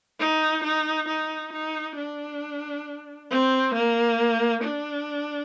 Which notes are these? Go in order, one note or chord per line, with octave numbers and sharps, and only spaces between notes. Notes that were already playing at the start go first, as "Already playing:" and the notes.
D#4
D#4
D#4
D#4
D4
C4
A#3
D4